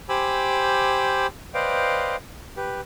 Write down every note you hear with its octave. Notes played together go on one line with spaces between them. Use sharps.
G4 C5 G#5 B5 D6 E6
B4 C5 D5 D#5 F5 G5
G4 B4